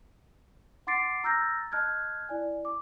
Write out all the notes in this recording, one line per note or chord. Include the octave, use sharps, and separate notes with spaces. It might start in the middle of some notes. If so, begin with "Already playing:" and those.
F#5 C6 D6 A6 C7 D7
A#5 E6 F6 G6 A6 A#6
D#5 A5 F6 F#6 G#6
E4 D5 G#5
D6